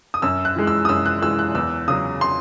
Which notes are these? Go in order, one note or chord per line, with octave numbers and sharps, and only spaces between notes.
D#6
F#2 E6
F#6
E3 G#3
E6
D#6
F#2 E6
F#6
E3 G#3 E6
F#6
E2 E6
C#3 F#3 D#6
C6